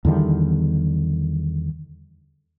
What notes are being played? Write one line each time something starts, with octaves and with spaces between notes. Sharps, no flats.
E2 D3 D#3 G3